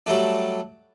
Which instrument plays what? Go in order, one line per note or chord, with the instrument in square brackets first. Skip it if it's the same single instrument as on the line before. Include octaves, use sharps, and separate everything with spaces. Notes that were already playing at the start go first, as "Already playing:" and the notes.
[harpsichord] F#3 G3 A3 D4